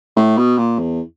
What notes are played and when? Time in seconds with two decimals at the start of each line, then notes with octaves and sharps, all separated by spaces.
0.16 A2
0.37 B2
0.58 A#2
0.78 E2